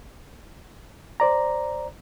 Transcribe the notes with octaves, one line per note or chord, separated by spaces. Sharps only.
C5 D5 A#5